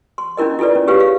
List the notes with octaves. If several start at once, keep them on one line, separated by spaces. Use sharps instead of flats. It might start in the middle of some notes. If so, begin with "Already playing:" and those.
C6
C#4 D4 E4 A#4 D#5
E4 F4 A4 B4 D5
C#4
G4 G#4 B4 C#5 F5
F5